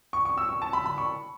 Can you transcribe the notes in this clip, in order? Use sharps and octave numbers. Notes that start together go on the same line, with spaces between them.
C#6
C#6
E6
C#6
A5
B5
B5
C#6